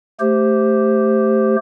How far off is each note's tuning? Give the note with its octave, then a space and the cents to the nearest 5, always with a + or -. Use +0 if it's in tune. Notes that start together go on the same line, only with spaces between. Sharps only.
A3 +0 G4 +0 C5 +0